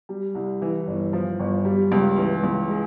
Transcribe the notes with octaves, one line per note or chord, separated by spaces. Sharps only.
G3
C2
E3
G1
F3
G1
G3
C#2
E3
C#2
G#3